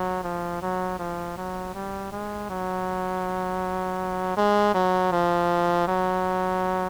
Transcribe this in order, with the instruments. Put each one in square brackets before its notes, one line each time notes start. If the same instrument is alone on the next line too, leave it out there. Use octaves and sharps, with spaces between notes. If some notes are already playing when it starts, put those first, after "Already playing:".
Already playing: [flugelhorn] F#3
F3
F#3
F3
F#3
G3
G#3
F#3
G#3
F#3
F3
F#3